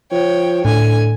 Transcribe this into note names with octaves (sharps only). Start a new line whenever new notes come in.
F3 C#5 G5
A2 D3 G#5